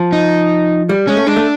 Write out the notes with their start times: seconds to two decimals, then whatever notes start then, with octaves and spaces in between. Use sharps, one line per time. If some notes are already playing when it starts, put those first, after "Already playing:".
Already playing: F3
0.13 D#4
0.89 G3
1.07 G#3 C#4
1.17 A3
1.27 G#3 D4
1.36 A3